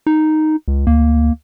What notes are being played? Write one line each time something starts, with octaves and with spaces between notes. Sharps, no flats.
D#4
C#2
D2 A#3